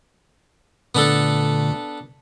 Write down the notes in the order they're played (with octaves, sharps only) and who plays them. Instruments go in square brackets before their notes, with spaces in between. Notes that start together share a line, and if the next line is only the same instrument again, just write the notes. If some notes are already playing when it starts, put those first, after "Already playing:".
[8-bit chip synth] A#2 D3 A3 [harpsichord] B3 D4 A4